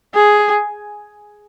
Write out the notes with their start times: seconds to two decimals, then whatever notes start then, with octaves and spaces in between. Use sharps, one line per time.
0.14 G#4